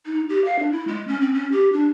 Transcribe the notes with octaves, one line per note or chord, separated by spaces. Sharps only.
D#4
G4
F5
D4
E4
G#3
C#4
C4
C#4
G4
D4